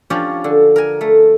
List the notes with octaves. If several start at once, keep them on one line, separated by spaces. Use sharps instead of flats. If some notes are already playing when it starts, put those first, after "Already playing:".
F3 C#4 D4 G4 C#5 D5
D3
A#4 G#5
A3